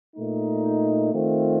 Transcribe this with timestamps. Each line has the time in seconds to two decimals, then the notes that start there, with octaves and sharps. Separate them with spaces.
0.16 A#2 A3 D#4
1.13 D#3 A3 C4 F4